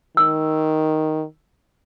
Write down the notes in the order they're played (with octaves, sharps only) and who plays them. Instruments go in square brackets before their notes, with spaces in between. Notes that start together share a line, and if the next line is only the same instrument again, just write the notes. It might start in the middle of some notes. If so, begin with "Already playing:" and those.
[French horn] D#3 [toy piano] E6